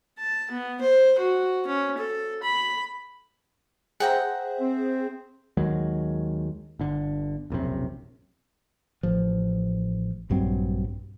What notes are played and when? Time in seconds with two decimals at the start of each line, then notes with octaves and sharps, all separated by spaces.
0.19 A5
0.51 B3
0.81 C5
1.19 F#4
1.67 C#4
1.98 A4
2.43 B5
4.00 G#4 C5 E5 F#5 G5 A#5
4.60 C4
5.57 D#2 D#3 F#3 G#3
6.79 G1 D3
7.50 E1 A#1 F#2 C3
9.03 A1 F3
10.30 A#1 G2 F#3 C4